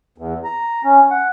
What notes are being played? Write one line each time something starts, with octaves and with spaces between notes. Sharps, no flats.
E2
A#5
C#4
F#5